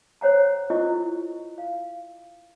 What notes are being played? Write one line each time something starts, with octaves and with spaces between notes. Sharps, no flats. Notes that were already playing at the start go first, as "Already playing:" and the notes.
C5 C#5 F#5 A#5
E4 F4 A4 C5 D#5 C#6
F5